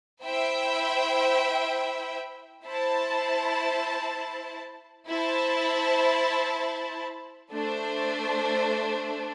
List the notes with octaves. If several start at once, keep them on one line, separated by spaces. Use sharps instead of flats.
E4 C5 E5 G5
E4 C5 A5
E4 C5 A5
A3 D4 C5